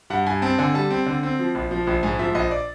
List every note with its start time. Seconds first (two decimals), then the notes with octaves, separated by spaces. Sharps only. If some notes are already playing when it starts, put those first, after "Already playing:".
0.10 G2 F#5
0.26 G2 G#5
0.42 C4 A5
0.59 D3 G#5
0.74 G3 A5
0.90 C4
1.06 D3
1.23 C4
1.39 F3
1.55 A#1
1.71 F3
1.87 A#1
2.03 G#2 G#5
2.19 F3 E5
2.35 A#1 D#5
2.51 D5